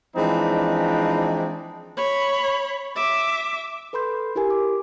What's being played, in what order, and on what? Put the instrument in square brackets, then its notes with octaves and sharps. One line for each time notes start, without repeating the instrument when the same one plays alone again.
[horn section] E3 F3 G#3 C4 D4 D#4
[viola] C#5 B5
E5 D6
[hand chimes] A4 B4 B5 C6 G6
E4 G4 A#4 G#5
D6